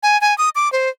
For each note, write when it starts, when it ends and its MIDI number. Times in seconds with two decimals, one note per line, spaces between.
0.03 0.19 80
0.21 0.36 80
0.38 0.49 87
0.55 0.71 86
0.72 0.89 72